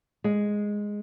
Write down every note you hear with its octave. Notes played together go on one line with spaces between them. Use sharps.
G#3